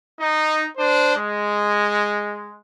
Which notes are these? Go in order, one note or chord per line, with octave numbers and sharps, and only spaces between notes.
D#4
D4 C5
G#3